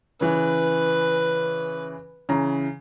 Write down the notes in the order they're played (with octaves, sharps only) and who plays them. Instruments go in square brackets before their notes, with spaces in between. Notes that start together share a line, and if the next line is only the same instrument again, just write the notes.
[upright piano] C#3 E3 [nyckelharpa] B4
[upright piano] C#3 E3 A#5